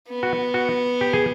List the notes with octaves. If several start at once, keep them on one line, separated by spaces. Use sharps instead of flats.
B3
F#4
F#4
G4
G#4